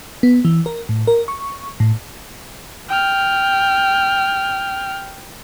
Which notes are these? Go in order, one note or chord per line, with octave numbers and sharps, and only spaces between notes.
B3
E3
A#4
A2
A#4
C#6
A2
G5 F6